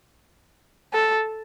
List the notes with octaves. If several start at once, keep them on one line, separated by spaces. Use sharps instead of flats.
A4